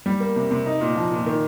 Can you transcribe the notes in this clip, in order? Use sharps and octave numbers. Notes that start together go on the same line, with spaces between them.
G3
A#3
C3
C3
D#4
A#2
F3
A#2
D#3